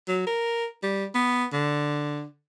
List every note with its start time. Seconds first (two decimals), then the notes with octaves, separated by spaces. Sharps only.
0.08 F#3
0.27 A#4
0.83 G3
1.15 B3
1.53 D3